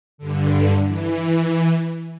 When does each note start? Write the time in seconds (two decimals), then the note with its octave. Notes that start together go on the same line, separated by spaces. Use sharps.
0.18 G2 D3
0.86 E3